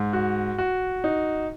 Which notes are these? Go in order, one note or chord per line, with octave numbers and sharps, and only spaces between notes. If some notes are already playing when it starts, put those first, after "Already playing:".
Already playing: G#2
F#4
F#4
D#4